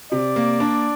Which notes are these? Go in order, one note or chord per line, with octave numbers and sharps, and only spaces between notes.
C3 D5
A#3
D4